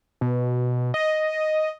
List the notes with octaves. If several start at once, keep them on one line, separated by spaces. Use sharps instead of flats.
B2
D#5